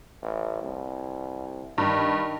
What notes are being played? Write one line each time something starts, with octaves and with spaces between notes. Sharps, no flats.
A1
C2
G2 D#3